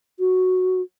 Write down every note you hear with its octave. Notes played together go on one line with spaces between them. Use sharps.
F#4